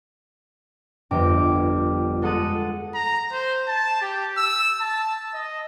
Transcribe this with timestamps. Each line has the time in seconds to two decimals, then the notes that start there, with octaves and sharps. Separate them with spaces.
1.11 G1 F2 G4 D6
2.22 G#3 A4 F#5 D#6 F#6 A6
2.94 A#5
3.32 C5
3.68 A5
4.01 G4
4.37 E6
4.81 A5
5.34 D#5